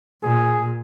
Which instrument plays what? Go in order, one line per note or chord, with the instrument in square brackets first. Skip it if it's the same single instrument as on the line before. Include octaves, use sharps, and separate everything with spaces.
[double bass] A#2 [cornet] G#4